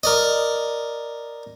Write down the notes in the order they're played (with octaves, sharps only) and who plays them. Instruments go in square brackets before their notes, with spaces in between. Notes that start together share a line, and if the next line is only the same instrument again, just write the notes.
[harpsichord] A#4 D5 D#5